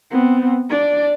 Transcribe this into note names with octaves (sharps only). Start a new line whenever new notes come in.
B3 C4
D4 D5